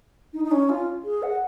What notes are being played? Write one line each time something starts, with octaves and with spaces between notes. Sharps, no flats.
D#4
D#4
C#4
F4
G#4
F#5